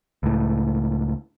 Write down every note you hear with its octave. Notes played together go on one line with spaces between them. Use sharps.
C#2 A2